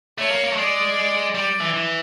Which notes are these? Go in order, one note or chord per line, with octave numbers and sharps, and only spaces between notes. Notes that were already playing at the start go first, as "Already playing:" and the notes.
A3 C#5
A#3
A#3
A3
G#3 D5
G3 D5
E3
E3